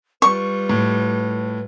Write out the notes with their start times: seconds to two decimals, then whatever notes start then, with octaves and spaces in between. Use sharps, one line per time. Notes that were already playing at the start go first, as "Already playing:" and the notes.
0.22 G3 F4 B4 C#6
0.69 A2